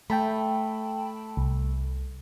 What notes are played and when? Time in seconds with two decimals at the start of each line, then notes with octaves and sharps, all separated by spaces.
0.10 A3 G5 A5 B5
1.37 C2